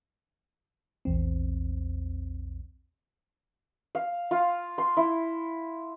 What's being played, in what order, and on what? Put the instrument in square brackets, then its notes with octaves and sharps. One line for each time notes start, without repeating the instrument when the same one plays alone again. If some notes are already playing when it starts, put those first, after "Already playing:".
[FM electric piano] A#1 E2 C4
[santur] F5
F4
C6
E4